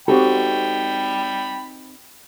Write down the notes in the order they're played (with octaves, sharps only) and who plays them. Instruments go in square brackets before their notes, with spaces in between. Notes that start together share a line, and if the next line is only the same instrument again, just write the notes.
[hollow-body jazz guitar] C4 D#4 A4 [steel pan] F#4 G4 [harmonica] G5 B5